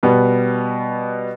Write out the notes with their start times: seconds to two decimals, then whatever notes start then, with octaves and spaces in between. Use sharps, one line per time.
0.03 B2 G3 B3